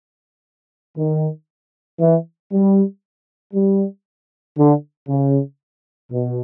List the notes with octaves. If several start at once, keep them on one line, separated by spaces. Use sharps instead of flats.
D#3
E3
G3
G3
D3
C#3
B2